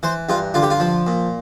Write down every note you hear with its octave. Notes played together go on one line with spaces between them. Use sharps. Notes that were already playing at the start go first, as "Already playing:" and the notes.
E3 C5
G2 F4
D3 F4
G4
F4
F3
A#2